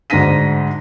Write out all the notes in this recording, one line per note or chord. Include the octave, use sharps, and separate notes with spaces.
D2 G#2 D4 A#6 B6 D#7